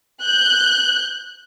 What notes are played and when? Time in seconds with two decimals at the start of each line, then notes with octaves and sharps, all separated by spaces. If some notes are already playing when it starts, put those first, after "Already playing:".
0.22 F#6 G6